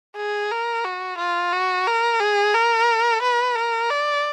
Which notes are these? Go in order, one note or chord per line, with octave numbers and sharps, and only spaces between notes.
G#4
A#4
F#4
F4
F#4
A#4
G#4
A#4
B4
A#4
D5